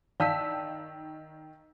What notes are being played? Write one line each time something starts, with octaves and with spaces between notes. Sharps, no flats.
D#3 D5 F5 A5 E6 B6